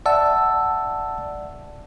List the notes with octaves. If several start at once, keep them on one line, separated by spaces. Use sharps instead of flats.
D5 E5 F#5 A5 E6